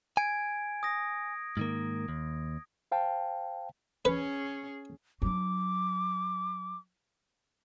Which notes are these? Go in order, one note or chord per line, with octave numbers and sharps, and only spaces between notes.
G#5 G#6 D7
D#6 A#6
G#2 D#3 A#3
D#2
C5 F5 G5 A5
C#4 G#4 B4
F#3 D4 D6